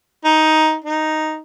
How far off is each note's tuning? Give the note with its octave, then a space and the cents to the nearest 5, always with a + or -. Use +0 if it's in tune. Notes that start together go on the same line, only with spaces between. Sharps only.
D#4 +10
D#4 +0